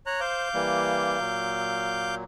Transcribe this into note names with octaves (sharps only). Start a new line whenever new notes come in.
C#5 A#5 F#6
C5 F5 D6 G6
E3 G3 A#3
A#2 F#3